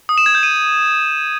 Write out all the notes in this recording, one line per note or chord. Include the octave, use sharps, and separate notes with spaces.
D#6
E7
G#6
G6
D#7